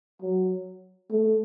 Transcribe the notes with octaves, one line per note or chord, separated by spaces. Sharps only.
F#3
A3